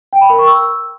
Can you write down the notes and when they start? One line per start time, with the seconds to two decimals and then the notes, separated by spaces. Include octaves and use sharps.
0.13 G5
0.21 B5
0.30 A#4
0.39 C#6
0.47 E6